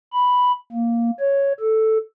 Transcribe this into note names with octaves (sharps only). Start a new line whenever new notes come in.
B5
A#3
C#5
A4